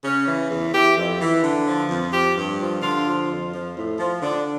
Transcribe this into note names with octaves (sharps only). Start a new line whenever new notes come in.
C#3 C#4
E3
E2
E3 G4
F2
E3
D3
F3
F2
F3 G4
G2
F3
D3 F4
F3
F2
F3
A2
F3
D3 D4